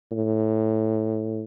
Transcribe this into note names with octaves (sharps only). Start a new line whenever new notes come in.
A2